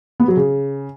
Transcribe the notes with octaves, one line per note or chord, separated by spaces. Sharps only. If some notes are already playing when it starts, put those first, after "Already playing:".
B3
F#3
C#3